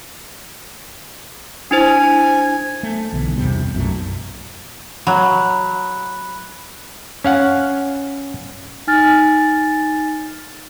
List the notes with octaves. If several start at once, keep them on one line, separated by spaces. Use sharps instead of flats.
D4 E4 C5 G#5
A3
B1 D3 E3
E2 G2 C3 G3
B1 F#2 A#2 A3
F#3 B5 F#6
C#4 F5 F#5
D#4 G#5 F6 A6